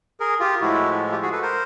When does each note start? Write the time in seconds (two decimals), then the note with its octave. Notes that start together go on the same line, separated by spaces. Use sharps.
0.20 G#4 A#4
0.40 F4 G4
0.61 A2 F3 G#3 E4 F#4
1.12 F4 G4
1.22 F#4 G#4
1.32 A4 B4
1.42 A#4 C5